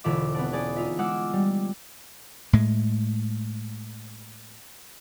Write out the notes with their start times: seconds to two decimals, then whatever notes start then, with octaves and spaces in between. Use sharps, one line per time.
0.04 E1 D3 F4 E5 D6
0.34 B3 C4 D4
0.52 C#4 G#4 D5
0.76 D#4 F4 E5
0.99 G#3 F#5 D6 E6 F6
1.33 G3
2.53 A2 G#3